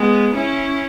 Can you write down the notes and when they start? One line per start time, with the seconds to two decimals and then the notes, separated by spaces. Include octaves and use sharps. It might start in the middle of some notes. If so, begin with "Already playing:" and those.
Already playing: G#3 B3
0.35 C#4 E4